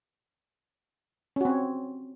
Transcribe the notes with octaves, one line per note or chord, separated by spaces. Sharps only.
C4 C#4 F#4 C#5